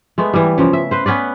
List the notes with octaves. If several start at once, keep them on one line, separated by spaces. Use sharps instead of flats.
G#3 A3 B3
E3 G3
C#3 F3
E5
B4 C5
B3 C#4 B4 D5